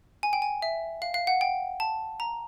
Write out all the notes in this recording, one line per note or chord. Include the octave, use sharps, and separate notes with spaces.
G#5
G5
G#5
E5
F5
F5
F#5
G5
A5
A#5